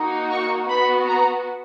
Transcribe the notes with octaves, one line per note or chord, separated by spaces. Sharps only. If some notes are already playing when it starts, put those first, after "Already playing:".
Already playing: A#3 D#4 F#4
C#6
B3 F#4 B5
A#5